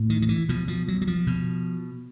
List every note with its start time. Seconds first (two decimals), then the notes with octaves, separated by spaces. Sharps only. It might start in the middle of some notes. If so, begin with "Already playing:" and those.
Already playing: A2
0.10 D#3
0.22 D#3
0.29 E3
0.49 B2 F3
0.68 F3
0.88 F#3
1.02 F#3
1.07 F3
1.27 B2